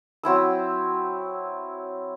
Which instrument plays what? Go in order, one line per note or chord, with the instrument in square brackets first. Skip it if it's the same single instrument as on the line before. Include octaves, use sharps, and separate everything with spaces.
[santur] F#3 C4 E4 E6